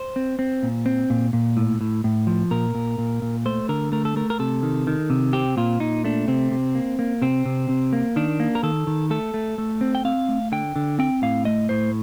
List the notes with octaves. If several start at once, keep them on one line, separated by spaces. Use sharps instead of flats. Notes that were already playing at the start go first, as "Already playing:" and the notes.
Already playing: C5
C4
C4
A#2
C4
A#2
A#2
A2
A2
A2
F3
A#2 A#4
A#2
A#2
A#2
A3 C5
D3 A#4
A3 A#4
A4
A3 A#4
A#4
C3 A4
D#3
D#3
C3
C4 G4
A#2 F4
A#2 D#4
A3 D4
C3 C4
C3
A#3
A#3
C3 C4
C3
C3
A#3
D#3 D4
A#3
A#4
D#3 A4
D#3
A3 A4
A3
A3
C4
G5
C4 F5
A3
D3 G5
D3
C4 G5
A2 F5
A3 D#5
A2 C5